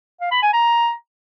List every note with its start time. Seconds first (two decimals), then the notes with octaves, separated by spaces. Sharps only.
0.21 F5
0.31 B5
0.42 G#5
0.53 A#5